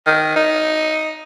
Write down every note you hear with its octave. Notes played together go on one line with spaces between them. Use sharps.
D#3
D#4